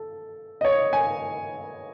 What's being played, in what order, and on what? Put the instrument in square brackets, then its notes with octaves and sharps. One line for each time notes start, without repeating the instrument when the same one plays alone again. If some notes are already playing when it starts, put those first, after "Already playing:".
Already playing: [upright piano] A4
D#5
C#5
G#5